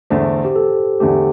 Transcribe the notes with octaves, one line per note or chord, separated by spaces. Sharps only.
E2 D3 A3 C5
G4
A4
E2 D3 A3 G4